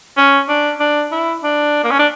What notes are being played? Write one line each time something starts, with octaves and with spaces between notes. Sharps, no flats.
C#4
D4
D4
E4
D4
A#3
C#4
D4